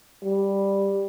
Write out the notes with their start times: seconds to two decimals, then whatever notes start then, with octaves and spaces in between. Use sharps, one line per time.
0.23 G3